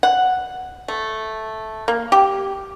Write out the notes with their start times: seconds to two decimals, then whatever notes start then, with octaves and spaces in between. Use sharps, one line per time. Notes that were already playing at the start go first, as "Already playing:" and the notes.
0.03 F#5
0.88 A3
1.88 A#3
2.12 G4